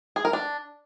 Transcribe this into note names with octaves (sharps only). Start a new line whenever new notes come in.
G#4
A#4
D4